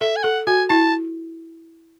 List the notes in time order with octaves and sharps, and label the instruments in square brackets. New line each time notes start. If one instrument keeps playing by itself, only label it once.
[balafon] A4 [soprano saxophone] E5
[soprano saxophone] G#5
[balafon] A4 [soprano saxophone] F#5
[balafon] F#4 [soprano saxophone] G#5
[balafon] E4 [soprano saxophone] A5